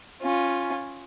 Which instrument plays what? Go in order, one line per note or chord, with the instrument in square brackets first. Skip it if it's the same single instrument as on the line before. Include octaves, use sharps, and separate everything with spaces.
[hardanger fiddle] C#4 F4